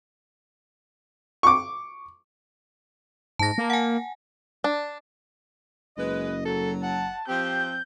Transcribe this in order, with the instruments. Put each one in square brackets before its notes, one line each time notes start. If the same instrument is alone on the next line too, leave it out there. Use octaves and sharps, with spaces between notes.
[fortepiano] C#6 D6
[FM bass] G#2 [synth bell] A5 A#6
[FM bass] A#3
[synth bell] F#5 G#5
[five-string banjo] D4
[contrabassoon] F#1 [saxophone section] G#3 B4 [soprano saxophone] D#5
[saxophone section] F#3 [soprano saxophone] A4
[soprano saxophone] F#5 [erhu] A5
[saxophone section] F3 C4 [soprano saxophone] G4 [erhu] G6